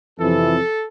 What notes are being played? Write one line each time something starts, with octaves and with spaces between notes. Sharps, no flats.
F2 C3 E3 A4